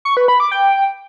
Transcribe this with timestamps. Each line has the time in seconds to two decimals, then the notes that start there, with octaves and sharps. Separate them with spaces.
0.05 C#6
0.17 B4
0.28 B5
0.40 D6
0.52 G5